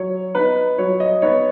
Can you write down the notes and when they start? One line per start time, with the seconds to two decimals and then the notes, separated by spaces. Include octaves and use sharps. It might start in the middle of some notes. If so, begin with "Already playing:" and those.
Already playing: F#3 C#5
0.35 B3 D#4 B4
0.78 F#3 C#5
1.00 D#5
1.22 B3 D#4 C#5